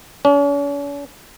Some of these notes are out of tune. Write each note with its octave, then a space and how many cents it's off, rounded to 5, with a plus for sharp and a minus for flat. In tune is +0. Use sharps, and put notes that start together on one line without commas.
C#4 +45